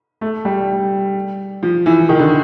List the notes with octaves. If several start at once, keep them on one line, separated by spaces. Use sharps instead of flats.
A3
G3
F3
E3
D#3
D3